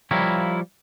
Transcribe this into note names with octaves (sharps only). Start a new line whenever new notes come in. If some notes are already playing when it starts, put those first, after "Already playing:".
F3 G3 E4 F4 A#4 C#5